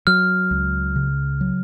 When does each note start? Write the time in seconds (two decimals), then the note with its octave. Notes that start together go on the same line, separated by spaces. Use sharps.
0.07 F#3 F6
0.51 C#2
0.96 C#3
1.41 F#3